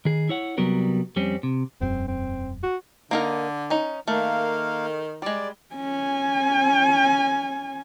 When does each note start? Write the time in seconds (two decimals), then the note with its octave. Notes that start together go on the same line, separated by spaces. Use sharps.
0.05 D#3 G#4
0.29 E4 C#5 F#5
0.58 C2 F#3 G3 B3 A#4
1.16 F2 G3 C4 C#4
1.43 C3
1.81 E1 F#2 C4
2.08 C4
2.63 F#4
3.11 D3 A#3 D#4 A#4
3.70 C#4 D#4
4.08 D#3 A3 A#3 F5
5.22 G3 G#3 D5
5.75 C#4 G#5